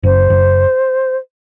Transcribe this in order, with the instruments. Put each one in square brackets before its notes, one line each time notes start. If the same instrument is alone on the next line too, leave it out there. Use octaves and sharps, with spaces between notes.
[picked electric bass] F#1 [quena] C5
[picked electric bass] F#1